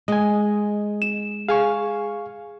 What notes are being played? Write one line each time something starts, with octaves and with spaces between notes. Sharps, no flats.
G#3 D#5 G#5
E7
G#4 F5 G#5 C#6